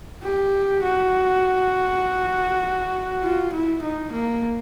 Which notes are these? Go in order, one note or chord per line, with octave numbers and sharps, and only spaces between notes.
G4
F#4
F4
E4
D#4
A#3